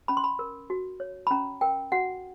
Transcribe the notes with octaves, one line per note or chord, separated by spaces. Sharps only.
C#4 B5
C6
B5
A#4
F#4
C#5
B5
C#4 A#5
A#4 G5
F#4 F#5